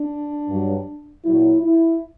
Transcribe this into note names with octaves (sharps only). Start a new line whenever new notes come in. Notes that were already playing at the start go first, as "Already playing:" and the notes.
Already playing: D4
G2 F#3
A#2 F#3 E4
E4